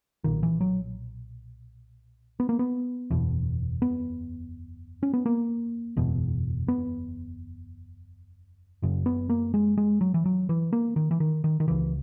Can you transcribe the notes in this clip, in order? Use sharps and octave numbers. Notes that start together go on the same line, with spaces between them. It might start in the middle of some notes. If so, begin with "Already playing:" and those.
B1 A#2 D#3
E3
F#3
B3
A#3
B3
F#1 E2 B2
B3
C#4
B3
A#3
F#1 E2 B2
B3
F#1 F#2 C#3
B3
A#3
G#3
G#3
F#3
E3
F#3
E3
A#3
D#3
E3
D#3
D#3
D#3
C#2 C#3 E3